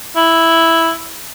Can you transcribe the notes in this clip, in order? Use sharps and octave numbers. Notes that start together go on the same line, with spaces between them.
E4